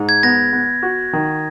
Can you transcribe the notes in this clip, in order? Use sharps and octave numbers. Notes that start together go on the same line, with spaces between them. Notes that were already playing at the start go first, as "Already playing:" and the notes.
Already playing: G#2 D#4
G#6
B3 A#6
B3
F#4
D#3